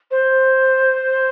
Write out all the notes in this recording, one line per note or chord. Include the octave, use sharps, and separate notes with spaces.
C5